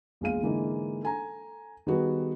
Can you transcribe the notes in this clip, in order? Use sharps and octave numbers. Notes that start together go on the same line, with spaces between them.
A#1 E2 G#3 F5 D#7
G#2 D3 E3 G#3 A#3 D#4
A4 G#5 A#5
D#3 G3 B3 F#4 G#4 B4